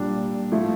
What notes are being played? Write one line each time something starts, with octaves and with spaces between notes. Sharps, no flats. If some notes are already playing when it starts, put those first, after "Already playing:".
Already playing: A#2 G3 D4
F3 A3 E4